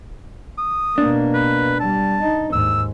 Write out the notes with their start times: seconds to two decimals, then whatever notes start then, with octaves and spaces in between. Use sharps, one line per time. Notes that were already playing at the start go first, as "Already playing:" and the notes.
0.58 D#6
0.98 B2 A#3 D4
1.34 B4
1.80 G3 A5
2.21 D#4
2.53 D#2 G#2 E6